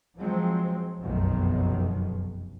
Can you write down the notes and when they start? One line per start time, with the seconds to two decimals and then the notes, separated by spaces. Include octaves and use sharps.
0.17 F3 F#3 G#3 C4
1.03 F1 B1 F#2 B2 D#3